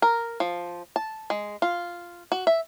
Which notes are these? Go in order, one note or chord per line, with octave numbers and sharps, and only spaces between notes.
A#4
F3
A5
G#3
F4
F#4
E5